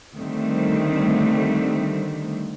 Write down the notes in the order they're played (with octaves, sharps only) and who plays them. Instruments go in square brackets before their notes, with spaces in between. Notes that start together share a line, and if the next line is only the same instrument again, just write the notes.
[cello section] D3 D#3 G3 A3 C4